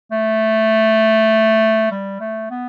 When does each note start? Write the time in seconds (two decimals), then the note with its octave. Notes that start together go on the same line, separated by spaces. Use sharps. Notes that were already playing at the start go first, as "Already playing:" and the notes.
0.11 A3
1.91 G3
2.20 A3
2.50 B3